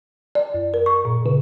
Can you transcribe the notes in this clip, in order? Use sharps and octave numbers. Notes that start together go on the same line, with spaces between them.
D5
F#2
A#4
C#6
A#2
C#3